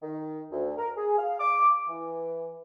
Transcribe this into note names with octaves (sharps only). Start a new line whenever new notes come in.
D#3
D2
A#4
G#4
F5
D6
E3